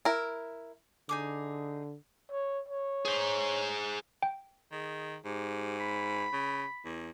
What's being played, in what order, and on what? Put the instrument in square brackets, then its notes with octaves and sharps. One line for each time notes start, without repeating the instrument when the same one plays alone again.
[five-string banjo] E4 A#4
[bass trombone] D3 [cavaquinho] D#4 G#4 D6
[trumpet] C#5
C#5
[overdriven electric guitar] G#4 C5
[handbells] G5
[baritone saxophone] D#3 [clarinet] G#4
[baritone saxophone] G#2 [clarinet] G4
[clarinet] B5
[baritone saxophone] C#3
E2